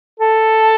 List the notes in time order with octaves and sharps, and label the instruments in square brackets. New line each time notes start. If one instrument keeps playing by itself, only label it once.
[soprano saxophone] A4